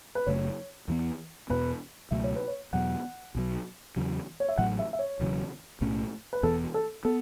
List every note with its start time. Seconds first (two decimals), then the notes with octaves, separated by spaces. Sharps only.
0.15 B4
0.26 F#1 F#2 C#3 A3 C#5
0.88 E2 E3 B3
1.50 E2 B2 B3 B4
2.11 C#2 B2 F#3 A3 E5
2.24 C#5
2.36 B4
2.48 C#5
2.73 E2 B2 F#3 B3 F#5
3.35 B1 B2 F#3
3.96 E2 C#3 F#3
4.40 C#5
4.49 E5
4.58 A1 A2 F#3 A3 F#5
4.79 E5
4.93 E5
4.99 C#5
5.20 E1 E2 C#3 F#3
5.81 B1 A2 A3 C#4
6.33 B4
6.43 E1 E2 E3 B3 A4
6.74 A4
7.05 B3 A4